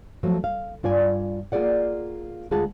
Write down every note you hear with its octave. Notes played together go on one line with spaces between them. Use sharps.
F3 F#3 A3
F5
G2 F4 D5 G#5
A#3 F4 G#4 D5 F#5
D2 G#3 F4 G#4 F#5 A5